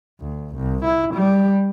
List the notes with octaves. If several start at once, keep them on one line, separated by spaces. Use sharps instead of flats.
D2
C2
E4
G3